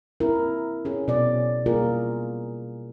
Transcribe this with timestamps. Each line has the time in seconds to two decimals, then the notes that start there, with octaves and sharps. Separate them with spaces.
0.20 C4 E4 A#4
0.85 C#4 G#4
1.08 B2 D5
1.66 G3 A#3 E4 F4 G#4 A#4